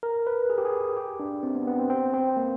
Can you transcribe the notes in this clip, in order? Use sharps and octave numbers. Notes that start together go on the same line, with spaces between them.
A#4
B4
G#4
G4
G#4
G4
D4
C4
B3
B3
C4
C4
C4
A#3